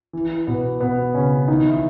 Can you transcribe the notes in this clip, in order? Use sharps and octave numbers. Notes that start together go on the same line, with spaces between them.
E3
B2 B3
B2 B3
C#3 C#4
D#3 D#4
E3 E4